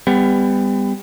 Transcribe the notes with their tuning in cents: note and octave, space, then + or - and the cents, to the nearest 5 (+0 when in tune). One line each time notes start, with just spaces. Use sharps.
G3 +25 B3 +30